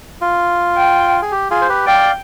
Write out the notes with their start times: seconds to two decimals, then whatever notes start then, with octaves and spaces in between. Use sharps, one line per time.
0.22 F4
0.77 G5
1.22 G#4
1.32 G4
1.51 F4 G#4
1.62 C5
1.69 G4 B4
1.87 D5 F5 G5